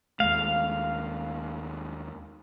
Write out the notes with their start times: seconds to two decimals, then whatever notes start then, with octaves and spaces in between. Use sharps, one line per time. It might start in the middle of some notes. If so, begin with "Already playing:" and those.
0.20 D#2 G#3 A3 F5